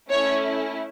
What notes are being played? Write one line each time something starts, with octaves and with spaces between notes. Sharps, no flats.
A3 C#4 E4 C#5